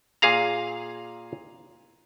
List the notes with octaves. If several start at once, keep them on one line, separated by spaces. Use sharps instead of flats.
A#2 G#4 F5 A#5